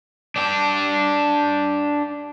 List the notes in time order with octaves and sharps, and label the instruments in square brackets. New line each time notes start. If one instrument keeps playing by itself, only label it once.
[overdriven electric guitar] D4 G4